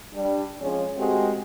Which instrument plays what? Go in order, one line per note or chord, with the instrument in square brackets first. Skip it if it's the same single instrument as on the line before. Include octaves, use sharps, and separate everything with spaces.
[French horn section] G3 D4
F3 G#3 C#4
G#3 A3 C4 F#4 G4